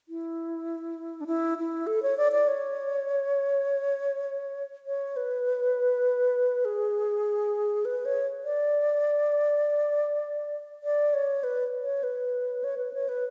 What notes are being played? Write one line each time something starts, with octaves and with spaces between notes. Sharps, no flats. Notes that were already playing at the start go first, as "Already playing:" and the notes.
E4
D4
E4
E4
A4
C#5
D5
D5
C#5
C#5
B4
G#4
B4
C#5
D5
D5
C#5
B4
C#5
B4
C#5
B4
C#5
B4